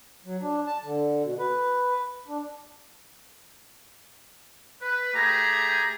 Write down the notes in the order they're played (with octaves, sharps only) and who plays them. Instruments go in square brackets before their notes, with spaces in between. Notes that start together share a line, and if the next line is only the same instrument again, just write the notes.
[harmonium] F#3
D4
A5
D3
B2
B4
D4
[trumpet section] B4
A3 G4 G#4 A#5